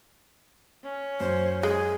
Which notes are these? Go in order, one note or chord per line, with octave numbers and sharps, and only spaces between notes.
C#4
F#2 C5
G#3 G#4